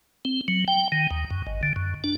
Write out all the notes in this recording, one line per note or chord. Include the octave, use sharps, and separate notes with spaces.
C4
F#3
G5
D#3
D#2
F#2
G#1
D3
F#2
D4